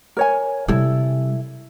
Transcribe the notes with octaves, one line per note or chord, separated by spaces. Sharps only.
A#4 C#5 G#5
C3 G3 E4 A4